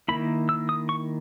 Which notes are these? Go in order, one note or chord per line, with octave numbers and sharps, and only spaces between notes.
D#3 A#3 E4 B5
E6
D#6
C#6